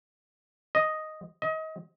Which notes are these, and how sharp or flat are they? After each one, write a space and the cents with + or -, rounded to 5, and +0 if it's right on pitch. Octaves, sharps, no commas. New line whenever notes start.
D#5 +0
D#5 +30